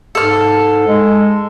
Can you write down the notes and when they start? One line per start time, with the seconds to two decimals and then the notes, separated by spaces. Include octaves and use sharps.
0.15 G#2 A4 F6
0.87 G#3